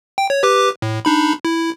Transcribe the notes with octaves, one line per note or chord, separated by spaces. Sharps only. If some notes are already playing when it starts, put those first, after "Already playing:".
G5
C#5
G4 B4 D6
A2
D4 D#4 B5
E4